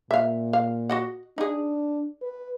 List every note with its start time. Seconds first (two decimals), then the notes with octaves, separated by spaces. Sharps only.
0.11 A#2 E5 F5
0.53 F5
0.89 F#4 D#5 F#5
1.38 D4 D#4 G#4
2.22 B4